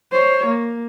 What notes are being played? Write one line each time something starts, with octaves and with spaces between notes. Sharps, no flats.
C5 C#5
A#3